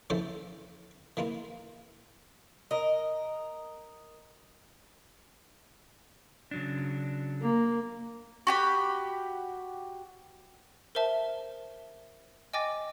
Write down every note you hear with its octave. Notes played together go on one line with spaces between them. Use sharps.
E3 F3 C#4 A4 C5
E3 A#3 E4 F4
A#4 D#5
C#3 F#3 D4
A#3
F#4 G4 B5
A#4 C5 E5 A5
D#5 G5 G#5 D6 A6 A#6